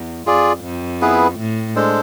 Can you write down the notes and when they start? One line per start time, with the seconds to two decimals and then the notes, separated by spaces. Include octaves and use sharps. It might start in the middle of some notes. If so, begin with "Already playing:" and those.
Already playing: E2
0.26 F2 F4 G#4 D5
0.64 F2
1.02 B3 E4 G#4 B4
1.39 A2
1.76 G#3 D4 A4 C5